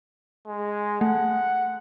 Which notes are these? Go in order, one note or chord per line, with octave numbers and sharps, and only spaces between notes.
G#3
A3 F#5